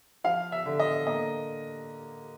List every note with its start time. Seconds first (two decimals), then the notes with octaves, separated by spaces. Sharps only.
0.24 F3 F5
0.52 E5
0.66 D3
0.80 D#5
1.07 A#3 D#5